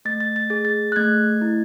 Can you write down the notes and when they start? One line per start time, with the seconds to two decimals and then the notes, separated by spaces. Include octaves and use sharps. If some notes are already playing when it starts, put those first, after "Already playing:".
0.05 A3 A6
0.20 A6
0.36 A6
0.50 G#4 A6
0.65 A6
0.92 F#6
0.96 A3 G#6
1.42 E4